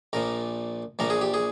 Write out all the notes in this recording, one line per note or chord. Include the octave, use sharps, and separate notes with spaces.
A#1 A#2 F3 A#4
A#1 A#2 F3 A#4
G#4
G4
G#4